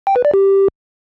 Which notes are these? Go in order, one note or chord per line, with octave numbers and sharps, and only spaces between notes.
G5
B4
D5
G4